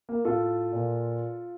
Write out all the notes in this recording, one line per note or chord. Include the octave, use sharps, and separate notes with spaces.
A#3
A2 F4 A4
A#2